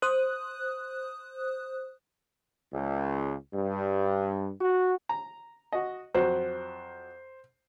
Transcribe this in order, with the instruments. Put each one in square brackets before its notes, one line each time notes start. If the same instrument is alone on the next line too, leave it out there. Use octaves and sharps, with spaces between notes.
[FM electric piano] C5 D#6 F#6
[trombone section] C#2
G2
F#4
[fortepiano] A#5
F#4 D#5
[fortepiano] F2 F#3 [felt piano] C5